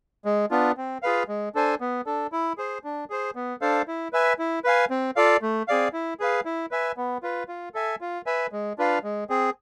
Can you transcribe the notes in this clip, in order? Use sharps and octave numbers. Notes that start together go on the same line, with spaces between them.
G#3
B3 D4 F4
C4
F4 G#4 B4 F5
G#3
D4 A4 C5 G#5
B3
D4 A4
E4
G#4 C5
D4
G#4 C5
B3
D4 A4 C5 F5
E4
B4 E5 G#5
E4
B4 F5 G#5
C4
F4 A4 D5 F5
A3
C4 G#4 D5 F5
E4
G#4 B4 F5
E4
B4 E5 G#5
B3
F4 B4
F4
A4 E5 G#5
F4
B4 E5 G#5
G#3
D4 F4 B4 F5
G#3
C4 G#4